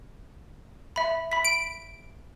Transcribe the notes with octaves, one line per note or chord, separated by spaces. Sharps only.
E5 B5
B5 B6
D7